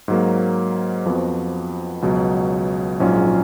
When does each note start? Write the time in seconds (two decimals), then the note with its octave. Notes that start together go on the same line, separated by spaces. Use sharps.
0.08 G#2 F#3 A#3
1.05 F2 F3 B3 F#4
2.02 C#2 B2 F#3
3.00 A#1 G#2 F#3 C#4 F4